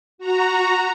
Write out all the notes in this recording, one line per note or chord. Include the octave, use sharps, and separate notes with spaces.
F#4 A#5